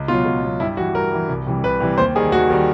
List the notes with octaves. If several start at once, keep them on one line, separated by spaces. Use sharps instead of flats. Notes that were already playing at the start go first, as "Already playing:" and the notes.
Already playing: C#2
B2 F#3 F4
C#2
B2 F#3
G2 E4
E3 G3 F#4
G2 A#4
E3 G3
C2
C3 E3 G3
C2 B4
C3 E3 G3
D#2 C5
D#3 G3 G#4
D#2 F#4
D#3 G3